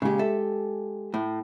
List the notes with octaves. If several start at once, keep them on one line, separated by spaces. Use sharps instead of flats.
A#2 C#3 G#3 G4
A4 E5
A2